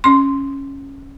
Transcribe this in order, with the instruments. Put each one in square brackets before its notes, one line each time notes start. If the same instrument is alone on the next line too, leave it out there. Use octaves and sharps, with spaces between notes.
[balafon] C#4 C6